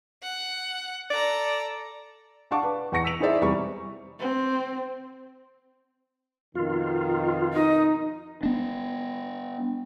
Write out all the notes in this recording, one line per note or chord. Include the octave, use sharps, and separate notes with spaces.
F#5
A4 D5 A#5
D4 F5 F#5 A5 C#6 D6
B4
E2 F#5 C#6 A#6 C#7
E6 B6 D7 F7
D#4 E4 G#4 C5 D5 E5
E2 C3 G3 C#6
C4
F2 B2 D#3 F4
D#4 D#5
B3 D4